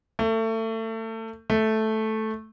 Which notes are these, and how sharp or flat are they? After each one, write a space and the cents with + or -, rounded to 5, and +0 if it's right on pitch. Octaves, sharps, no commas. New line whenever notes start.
A3 +30
A3 -5